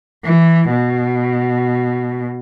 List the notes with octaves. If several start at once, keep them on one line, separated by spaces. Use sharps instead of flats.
E3
B2